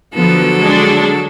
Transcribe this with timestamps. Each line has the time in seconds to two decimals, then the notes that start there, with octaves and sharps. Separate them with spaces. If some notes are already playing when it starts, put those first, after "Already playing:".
0.14 D3 F3 F#3 B3 A4
0.59 G#3 D4